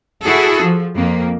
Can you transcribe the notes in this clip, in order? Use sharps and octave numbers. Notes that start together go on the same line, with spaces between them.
E4 F#4 G#4 A4
F3
F2 A#3